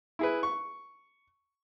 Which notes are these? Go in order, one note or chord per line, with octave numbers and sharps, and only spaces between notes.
E4 G#4 B4
C#6